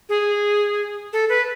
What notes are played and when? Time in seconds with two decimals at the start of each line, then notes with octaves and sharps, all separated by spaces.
0.09 G#4
1.13 A4
1.29 B4